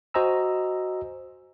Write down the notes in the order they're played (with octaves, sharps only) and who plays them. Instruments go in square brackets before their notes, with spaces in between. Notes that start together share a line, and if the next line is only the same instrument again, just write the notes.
[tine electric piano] F#4 C5 D#5 G#5 A#5 E6